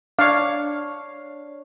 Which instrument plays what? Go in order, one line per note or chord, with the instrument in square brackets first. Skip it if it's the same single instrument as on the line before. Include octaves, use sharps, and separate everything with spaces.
[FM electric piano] D4 C#5 [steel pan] F5